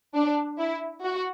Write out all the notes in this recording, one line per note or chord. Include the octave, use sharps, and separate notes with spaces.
D4
E4
F#4